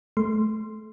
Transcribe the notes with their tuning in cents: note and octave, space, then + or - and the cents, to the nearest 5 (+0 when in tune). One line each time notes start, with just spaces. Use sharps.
A3 -25 C6 +0